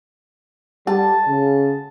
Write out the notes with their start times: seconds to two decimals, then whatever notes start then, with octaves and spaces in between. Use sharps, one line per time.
0.87 G3 A5
1.28 C#3